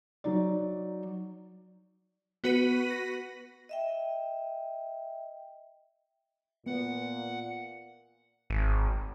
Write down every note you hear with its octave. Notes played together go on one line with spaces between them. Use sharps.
F#3 D#4 D5
B3 F#4 B4 B6 D#7
A#6
D#5 E5 G5
A#2 B3 F#5
G#1